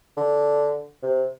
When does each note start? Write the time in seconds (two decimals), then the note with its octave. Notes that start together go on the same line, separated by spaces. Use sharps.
0.17 D3
1.03 C3